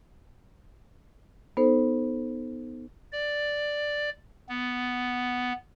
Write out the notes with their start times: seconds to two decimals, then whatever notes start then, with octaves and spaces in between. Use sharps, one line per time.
1.57 B3 D#4 A4 C5
3.12 D5
4.49 B3